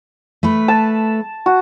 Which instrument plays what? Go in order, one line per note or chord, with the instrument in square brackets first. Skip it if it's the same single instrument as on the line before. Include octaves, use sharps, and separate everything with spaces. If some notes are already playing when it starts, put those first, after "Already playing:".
[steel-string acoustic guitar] A3 B4
[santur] A5
F#4